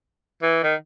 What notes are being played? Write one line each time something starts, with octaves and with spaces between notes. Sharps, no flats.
E3
D#3